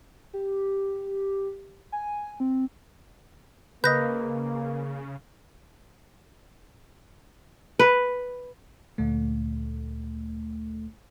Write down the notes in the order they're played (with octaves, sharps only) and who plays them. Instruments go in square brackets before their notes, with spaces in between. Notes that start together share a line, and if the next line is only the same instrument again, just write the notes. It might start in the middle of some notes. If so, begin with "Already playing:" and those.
[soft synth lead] G4
G#5
C4
[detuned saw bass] C#3 [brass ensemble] A#3 [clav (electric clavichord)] B4 D#5 [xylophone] G6 A#6
[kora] B4
[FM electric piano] D2 A#2 A3